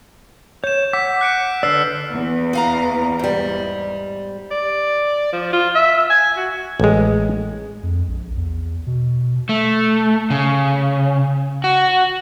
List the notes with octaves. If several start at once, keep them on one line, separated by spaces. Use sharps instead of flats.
C#5 G6 E7
F#5 D6 E6 B6
F#6 C#7 D7
D3 B4 D5 E6 F6 C7
E2
B3 F5 A#5
G#2 G3
D5
F3
F4
E5
G#5
F#4
A1 G#3
F2
A#1
E2
B2
A3
C#3
F#4